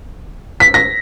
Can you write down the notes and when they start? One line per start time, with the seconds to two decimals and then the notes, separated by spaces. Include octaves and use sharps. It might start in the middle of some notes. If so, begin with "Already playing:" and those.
0.60 B6
0.74 A#6